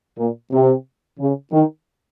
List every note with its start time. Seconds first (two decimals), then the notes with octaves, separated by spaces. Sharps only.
0.18 A#2
0.52 C3
1.19 C#3
1.53 D#3